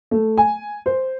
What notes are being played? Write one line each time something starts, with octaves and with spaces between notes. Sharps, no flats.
A3
G#5
C5